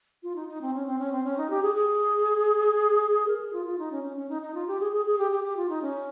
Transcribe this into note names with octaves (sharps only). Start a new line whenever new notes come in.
F4
D#4
D#4
C4
C#4
C4
C#4
C4
C#4
D#4
G4
G#4
G#4
A#4
G#4
F4
F4
D#4
C#4
C#4
C#4
D#4
D#4
F4
G4
G#4
G#4
G#4
G4
G4
G4
F4
D#4
C#4